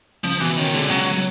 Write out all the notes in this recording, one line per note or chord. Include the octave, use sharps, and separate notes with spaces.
C#2 F3
B2 E3
D#3 C#4
D3 G#3
C#2 F#3
B2
F#3